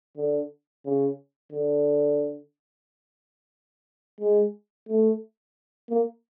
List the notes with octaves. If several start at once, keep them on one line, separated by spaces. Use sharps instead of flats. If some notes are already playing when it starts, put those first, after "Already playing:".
D3
C#3
D3
G#3
A3
A#3